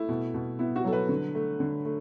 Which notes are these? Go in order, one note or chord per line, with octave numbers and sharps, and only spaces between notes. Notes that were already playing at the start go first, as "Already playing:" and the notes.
Already playing: A3 E4
B2
B2
B3 E4
F#4
F#3 A4
B4
D3
A3
D3
A3